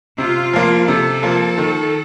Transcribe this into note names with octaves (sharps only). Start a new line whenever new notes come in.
C3 F4
F3 A#3
C3 A4
F3 A#3
D#3